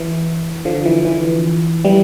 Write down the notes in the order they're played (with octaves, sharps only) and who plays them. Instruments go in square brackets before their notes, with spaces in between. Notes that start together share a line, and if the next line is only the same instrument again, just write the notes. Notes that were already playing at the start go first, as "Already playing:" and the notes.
Already playing: [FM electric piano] E3
D3 F3
E3
E3
E3 G3